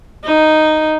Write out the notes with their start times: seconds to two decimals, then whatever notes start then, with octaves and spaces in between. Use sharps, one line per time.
0.24 D#4